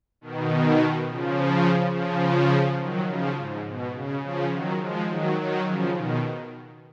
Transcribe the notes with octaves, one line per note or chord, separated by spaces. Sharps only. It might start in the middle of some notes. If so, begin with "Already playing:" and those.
B2 D#3
C#3 F3
C#3 F3
D#3 F#3
C#3 F3
G#2
B2
C#3
C#3 F3
D#3 F#3
F3 G#3
D#3 F#3
D#3 F#3
C#3 F3
B2 D#3